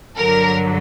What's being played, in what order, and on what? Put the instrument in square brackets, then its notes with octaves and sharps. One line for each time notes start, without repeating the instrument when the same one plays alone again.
[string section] G2 D3 F#3 A#4